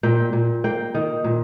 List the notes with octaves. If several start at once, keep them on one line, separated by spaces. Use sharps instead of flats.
A#2 G5
A#2
A#3 G5
D#3
A#2